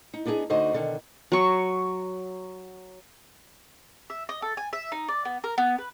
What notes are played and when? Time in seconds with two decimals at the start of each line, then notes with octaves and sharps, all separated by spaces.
0.14 D#4
0.26 B3 D4 D#4 G4 G#4
0.50 D2 D3 D#4 F#4 C5 D#5
0.73 B2 D3 D#3
1.32 F#3 C#6
4.10 E5
4.29 D#5
4.42 A4
4.57 G#5
4.73 E5
4.92 D#4
5.08 D5
5.25 B3
5.44 A#4
5.58 B3
5.78 B4